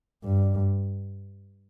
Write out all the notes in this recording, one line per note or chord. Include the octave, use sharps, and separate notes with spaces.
G2